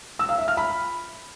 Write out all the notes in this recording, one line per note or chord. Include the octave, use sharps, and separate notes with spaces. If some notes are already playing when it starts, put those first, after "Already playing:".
E6
F5
E5
F6
B5